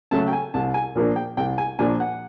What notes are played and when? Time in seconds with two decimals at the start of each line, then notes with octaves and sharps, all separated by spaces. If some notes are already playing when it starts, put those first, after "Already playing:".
0.11 C#3 F#3 A3 C#4 A5
0.28 G5
0.33 G#5
0.54 C2 A5
0.74 G#5
0.95 A#2 F3 A#3 D4
1.16 G5
1.37 C2 G5
1.58 G#5
1.79 A#2 F3 A#3 D4 G#5
2.00 F#5